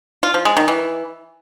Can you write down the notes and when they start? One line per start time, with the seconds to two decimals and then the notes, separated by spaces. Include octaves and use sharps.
0.23 F4
0.34 F3
0.45 G#3
0.57 D#3
0.68 E3